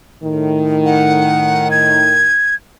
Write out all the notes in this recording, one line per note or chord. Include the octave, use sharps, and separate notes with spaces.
A2 D#3
F#5
G#6